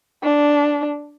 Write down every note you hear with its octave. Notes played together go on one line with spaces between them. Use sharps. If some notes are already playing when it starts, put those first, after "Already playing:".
D4